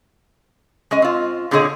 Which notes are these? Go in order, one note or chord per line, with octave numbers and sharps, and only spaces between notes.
G#3 C#4 D#5
C4 F4
A#2 D3 C4 G#4 C#5 D#5